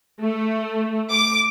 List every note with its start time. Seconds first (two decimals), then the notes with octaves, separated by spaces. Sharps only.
0.20 A3
1.11 D6